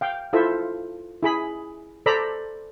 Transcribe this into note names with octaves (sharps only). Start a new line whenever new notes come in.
F5 G5
E4 F4 A4 C5 E5
E4 G#4 B5
A4 C5 D5 A#5 B5 E6